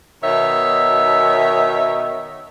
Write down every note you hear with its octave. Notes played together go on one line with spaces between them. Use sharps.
B2 D#3 D#4 C#5 E5